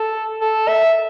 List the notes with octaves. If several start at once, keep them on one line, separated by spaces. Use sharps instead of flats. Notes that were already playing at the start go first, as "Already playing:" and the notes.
Already playing: A4
A4
E5